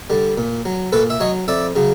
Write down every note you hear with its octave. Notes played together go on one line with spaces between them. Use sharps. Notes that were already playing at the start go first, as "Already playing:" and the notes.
D3 G3
A#2
F#3
A#2 A4 B4
E5
F#3 C#5 D#5
F2 D5 E5
C#3 F#3